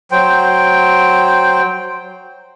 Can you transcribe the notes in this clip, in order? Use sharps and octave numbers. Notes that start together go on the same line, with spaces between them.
F#3 C5 G5